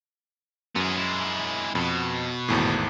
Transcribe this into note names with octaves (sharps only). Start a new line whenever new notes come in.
F#2 B3 G#4
G#3 E4
F2 B2
G#1 E2 A2